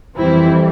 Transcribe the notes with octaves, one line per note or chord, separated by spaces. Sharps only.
F2 E3 G3 C4 E4